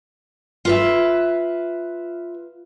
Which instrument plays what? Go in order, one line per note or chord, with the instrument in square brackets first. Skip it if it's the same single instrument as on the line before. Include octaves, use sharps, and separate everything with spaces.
[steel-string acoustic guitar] F4 B4 E5